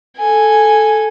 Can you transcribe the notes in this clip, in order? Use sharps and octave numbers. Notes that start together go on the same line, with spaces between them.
A4 G#5